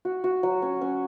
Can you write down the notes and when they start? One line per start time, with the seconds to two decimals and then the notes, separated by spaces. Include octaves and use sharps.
0.05 F#4
0.24 F#4
0.43 F#3
0.62 C#4
0.81 C#4